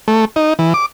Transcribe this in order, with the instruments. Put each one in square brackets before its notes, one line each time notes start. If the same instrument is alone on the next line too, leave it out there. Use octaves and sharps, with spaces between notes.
[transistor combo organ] A3
D#4
E3
D6